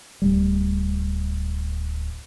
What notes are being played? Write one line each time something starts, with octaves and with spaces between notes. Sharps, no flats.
D1 G3